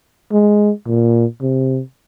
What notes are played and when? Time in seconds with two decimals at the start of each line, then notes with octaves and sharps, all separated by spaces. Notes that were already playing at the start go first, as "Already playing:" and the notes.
0.32 G#3
0.87 A#2
1.42 C3